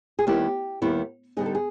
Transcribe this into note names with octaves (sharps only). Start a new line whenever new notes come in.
G#4
D#2 D#3 G3 B3 E4 G4
D#2 D#3 G3 B3 E4
D3 G3 B3 D#4 G#4
A4
G#4